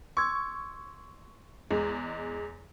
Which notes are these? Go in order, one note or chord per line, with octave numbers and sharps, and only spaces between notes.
C6 C#6 E6 G#6
E2 G#3